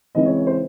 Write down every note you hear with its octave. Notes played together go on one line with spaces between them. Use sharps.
C#3 E3 G#3 C4 D#5
C#5
C#5
C5